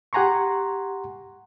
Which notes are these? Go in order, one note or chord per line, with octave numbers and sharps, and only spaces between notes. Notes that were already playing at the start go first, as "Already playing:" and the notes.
G4 F#5 G#5 A#5 C6 C#6